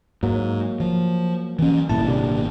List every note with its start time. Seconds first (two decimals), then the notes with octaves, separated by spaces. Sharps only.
0.23 G#2 F#3 A#3
0.80 F3
1.59 E3 C#4
1.89 G#1 A#2 G3 E4 A5
2.06 C3 D4 G4